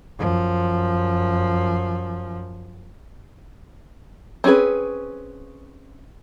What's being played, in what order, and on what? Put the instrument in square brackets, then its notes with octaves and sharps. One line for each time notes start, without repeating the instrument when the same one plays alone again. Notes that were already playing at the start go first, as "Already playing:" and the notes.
[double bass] F#2 F3
[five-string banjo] C4 C#4 F#4 G#4 B4